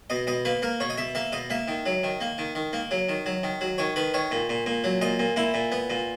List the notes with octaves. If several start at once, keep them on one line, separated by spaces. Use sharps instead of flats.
B2 D#5
B2 D#5
A#3 B4
A#3 A#4
B2 C#5
D#5
B2 E5
A#3 E5
B2 D#5
A#3 E5
D#3
F#3
D#3
A#3
D#3
D#3
A#3
F#3
D#3
F#3
D#3
F#3
D#3 C#5
D#3 B4
D#3 C#5
A#2
A#2
A#2
F#3
A#2 D#5
A#2
A#2 E4
A#2
B3
A#2